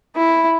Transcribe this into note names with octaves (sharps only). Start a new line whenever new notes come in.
E4